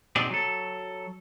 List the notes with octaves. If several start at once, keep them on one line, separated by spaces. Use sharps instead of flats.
B2 C4 D#4 G#4 D5
F#3 A4